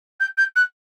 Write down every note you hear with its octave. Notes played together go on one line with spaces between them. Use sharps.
G6
G6
F#6